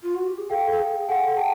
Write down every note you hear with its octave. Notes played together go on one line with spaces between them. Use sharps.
F4
F#4
G4
G#4
A4 F5 G5
A4
G#4
A4 F#5 G#5
A4
G#4 G5 A5